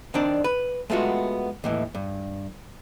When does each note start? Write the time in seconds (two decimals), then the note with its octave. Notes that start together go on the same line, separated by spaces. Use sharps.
0.14 D#3 C4 D4 D5
0.44 B4
0.90 G#3 A3 B3 F4 F#4
1.64 D#2 A2 E3
1.95 G2